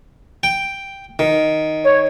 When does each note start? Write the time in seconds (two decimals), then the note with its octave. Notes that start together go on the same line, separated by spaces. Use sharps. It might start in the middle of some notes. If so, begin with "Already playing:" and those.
0.43 G5
1.19 D#3
1.84 C#5